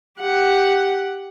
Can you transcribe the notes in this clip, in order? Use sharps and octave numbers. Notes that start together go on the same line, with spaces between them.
G4 F#5